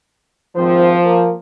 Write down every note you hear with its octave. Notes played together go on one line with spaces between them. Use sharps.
G#1 F3 C4 C5
A#3